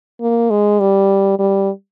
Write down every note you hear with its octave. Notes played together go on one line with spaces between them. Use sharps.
A#3
G#3
G3
G3